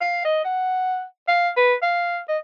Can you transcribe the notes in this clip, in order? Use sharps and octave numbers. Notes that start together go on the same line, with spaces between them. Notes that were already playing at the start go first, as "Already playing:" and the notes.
F5
D#5
F#5
F5
B4
F5
D#5